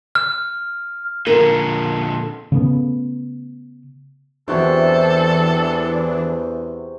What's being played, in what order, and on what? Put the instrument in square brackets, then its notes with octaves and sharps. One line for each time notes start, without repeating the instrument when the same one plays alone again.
[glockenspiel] F6
[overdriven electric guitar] A#2 D3 [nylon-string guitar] A#4
[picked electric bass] C#3 A3 B3
[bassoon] E2 [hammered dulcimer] C3 F#4 E5 [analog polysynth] E3 D4 [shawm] A4